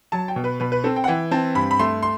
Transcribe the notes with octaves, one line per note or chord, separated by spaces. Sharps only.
F#3 A5
G5
B2
B4
B2 B4
B4
C4 A4
G5
F#5
E3 G5
C4 A5
G2 B5
B5
A3 C6
C6